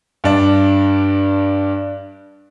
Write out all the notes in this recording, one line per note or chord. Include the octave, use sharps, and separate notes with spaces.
G2 D4